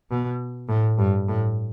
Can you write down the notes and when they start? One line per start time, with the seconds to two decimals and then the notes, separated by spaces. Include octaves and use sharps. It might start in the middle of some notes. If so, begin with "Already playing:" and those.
0.10 B2
0.69 A2
0.99 G2
1.28 A2